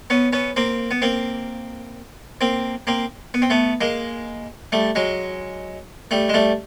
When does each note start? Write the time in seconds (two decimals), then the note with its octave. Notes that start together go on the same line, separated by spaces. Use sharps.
0.10 B3 C#4
0.33 B3 C#4
0.56 A#3 C4
0.91 B3
1.02 A#3 C4
2.41 A#3 C4
2.87 A#3 C4
3.34 B3
3.42 C4
3.50 A3 B3
3.81 G#3 A#3
4.72 G3 A3
4.95 F#3 G#3
6.11 G3 A3
6.29 G#3
6.34 G3 A3